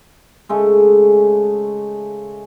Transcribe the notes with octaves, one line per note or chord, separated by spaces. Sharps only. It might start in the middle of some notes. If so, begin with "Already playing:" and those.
C#3 G#3 A3